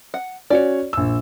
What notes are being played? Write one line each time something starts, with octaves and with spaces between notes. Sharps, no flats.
F#5
C#4 F#4 C#5 D5
A#1 E6